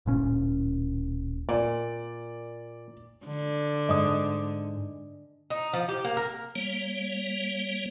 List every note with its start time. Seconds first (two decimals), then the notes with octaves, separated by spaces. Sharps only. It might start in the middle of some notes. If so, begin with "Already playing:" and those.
0.06 D1 A#2 C#4
1.49 A#2 D5
3.26 D3
3.89 G#2 D#5 D#6
5.50 D#4
5.73 F3
5.89 G4
6.05 A#3
6.17 A#4
6.56 G3 A#3 C#5